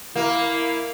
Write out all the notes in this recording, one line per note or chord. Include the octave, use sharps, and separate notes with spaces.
A#3 E4